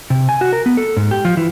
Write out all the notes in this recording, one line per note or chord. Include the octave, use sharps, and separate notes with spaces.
C3
G#5
F#4
A#4
B3
A4
G#2
G4
F3
E3